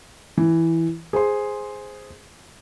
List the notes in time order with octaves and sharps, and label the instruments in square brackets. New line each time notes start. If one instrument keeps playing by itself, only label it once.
[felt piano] E3
G#4 C5 C6